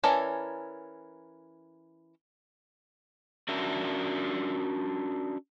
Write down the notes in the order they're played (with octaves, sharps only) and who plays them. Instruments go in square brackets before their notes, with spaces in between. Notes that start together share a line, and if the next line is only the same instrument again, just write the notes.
[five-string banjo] E3 C#4 A4 A#4 D5
[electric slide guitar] C#4 D4 F#4 A#4 E5